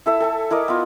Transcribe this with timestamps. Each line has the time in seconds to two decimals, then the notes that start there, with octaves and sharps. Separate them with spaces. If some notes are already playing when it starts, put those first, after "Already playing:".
0.06 E4 A4 E5
0.20 A4 G#5 A5
0.50 E4 A#4 D5 D#5
0.68 B3 F4